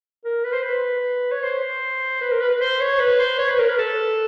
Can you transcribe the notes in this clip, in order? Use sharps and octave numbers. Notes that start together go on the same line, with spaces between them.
A#4
B4
C5
B4
C#5
C5
B4
A#4
B4
B4
C5
C#5
B4
C5
C#5
B4
A#4
B4
A4